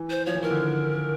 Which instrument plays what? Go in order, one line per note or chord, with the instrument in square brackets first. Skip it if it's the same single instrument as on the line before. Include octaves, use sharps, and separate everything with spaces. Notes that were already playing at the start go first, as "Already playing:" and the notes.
Already playing: [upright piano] E3
[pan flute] C5
[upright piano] F3 [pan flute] C#5
[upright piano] E3
[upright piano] D#3 [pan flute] A#4
[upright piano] D3